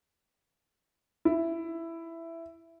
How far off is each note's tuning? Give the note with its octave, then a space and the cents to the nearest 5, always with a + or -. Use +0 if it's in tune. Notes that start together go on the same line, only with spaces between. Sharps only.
E4 +10